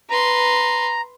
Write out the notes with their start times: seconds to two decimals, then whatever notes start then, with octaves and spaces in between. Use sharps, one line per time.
0.10 B4 A#5 C6